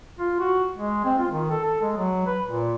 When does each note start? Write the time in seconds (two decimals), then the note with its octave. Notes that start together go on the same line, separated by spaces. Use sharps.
0.19 F4
0.40 F#4
0.75 G#3
1.05 C4
1.19 F4
1.31 D#3
1.50 A4
1.64 A4
1.82 G#3
1.97 F#3
2.27 B4
2.46 A#2